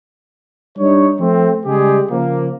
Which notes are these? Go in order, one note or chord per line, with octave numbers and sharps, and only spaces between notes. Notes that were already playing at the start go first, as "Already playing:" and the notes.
G3 D4 D#4 C#5
F3 A3 C4
C#3 G3 G#3 G4 G#4
C#3 F3 A#3